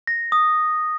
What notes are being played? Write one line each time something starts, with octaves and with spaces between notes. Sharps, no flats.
A#6
D#6